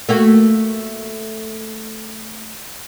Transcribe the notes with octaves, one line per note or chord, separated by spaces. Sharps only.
A3 A#3 F#4